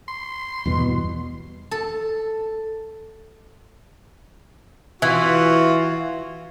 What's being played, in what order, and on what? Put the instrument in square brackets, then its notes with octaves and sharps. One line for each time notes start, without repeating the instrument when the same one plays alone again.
[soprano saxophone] C6
[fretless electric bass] E2 G2 B2
[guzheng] A4
[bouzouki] E3 [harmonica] F4 F#4